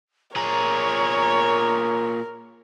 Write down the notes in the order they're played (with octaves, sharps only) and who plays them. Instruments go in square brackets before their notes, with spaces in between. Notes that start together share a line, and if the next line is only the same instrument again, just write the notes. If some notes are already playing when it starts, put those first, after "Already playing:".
[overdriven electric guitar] A#2 G#4 [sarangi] A#4 [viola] C#5 [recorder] A#5